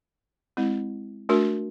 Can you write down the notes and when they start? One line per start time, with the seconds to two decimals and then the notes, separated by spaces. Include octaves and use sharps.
0.57 G#3 C4 E4
1.29 A3 D4 F#4 A#4